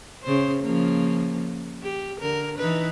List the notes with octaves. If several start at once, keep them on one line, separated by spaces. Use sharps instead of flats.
C#3 C5
C#3 F3 A#3
G4
D3 A#4
E3 D#4 B4